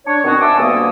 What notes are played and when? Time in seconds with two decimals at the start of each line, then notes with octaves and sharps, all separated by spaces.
0.06 D4 C#5
0.23 B2 D#3 B3 C4 F#4 G#4
0.40 E5 G#5 A5 C6 D6 E6
0.57 D2 G2 A#3 B3 D#6